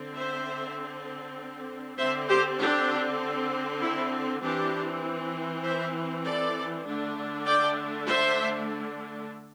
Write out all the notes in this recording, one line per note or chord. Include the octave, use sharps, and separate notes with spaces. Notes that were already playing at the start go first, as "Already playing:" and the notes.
Already playing: D3 C4
C5 E5
D3 C4 C5 E5
G4 C5
D4 G4
E4
E3 C4 D4 G4
C5 E5
A4 D5
D3 A3 D4
D5 G5
C5 E5